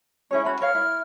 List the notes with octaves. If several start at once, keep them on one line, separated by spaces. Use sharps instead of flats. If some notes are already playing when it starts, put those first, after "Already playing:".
C#4 E4 G#4 C#5
C#4 F#4 B5
A#4 C#5 F5 F6
E4